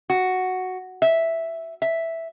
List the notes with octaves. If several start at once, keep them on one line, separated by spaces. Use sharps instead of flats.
F#4
E5
E5